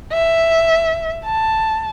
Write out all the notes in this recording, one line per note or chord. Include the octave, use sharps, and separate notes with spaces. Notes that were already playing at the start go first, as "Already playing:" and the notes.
E5
A5